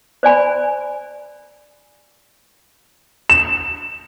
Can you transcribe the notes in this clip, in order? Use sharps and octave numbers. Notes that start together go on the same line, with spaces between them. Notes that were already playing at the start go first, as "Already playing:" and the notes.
C5 D5 G#5 B5
E7